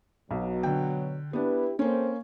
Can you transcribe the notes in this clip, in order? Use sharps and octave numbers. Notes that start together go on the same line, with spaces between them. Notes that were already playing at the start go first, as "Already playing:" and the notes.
B1 B2 F#3
D3 G5
B3 D4 E4 G4 B4
A#3 C4 C#4 A4 C5